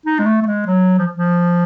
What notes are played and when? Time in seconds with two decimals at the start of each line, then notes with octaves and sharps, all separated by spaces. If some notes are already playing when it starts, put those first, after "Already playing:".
0.06 D#4
0.19 G#3
0.26 A3
0.42 A3
0.46 G#3
0.67 F#3
0.98 F3
1.13 F3